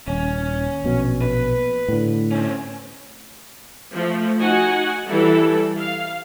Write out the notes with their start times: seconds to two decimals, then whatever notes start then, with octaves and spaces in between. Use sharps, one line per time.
0.08 D#1 C#4
0.84 A#1 B2 F#3
1.21 B4
1.88 A2 D3
2.31 C4 C#4
3.94 F3 A3
4.39 D#4 F#4 F#5 G#5
5.10 E3 G3 E4 A4
5.80 F5